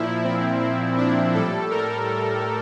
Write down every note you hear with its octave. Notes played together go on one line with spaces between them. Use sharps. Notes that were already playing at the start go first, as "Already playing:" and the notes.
Already playing: A#2 F3 E4
C4
C4
D4
A2 G3 A4
A#4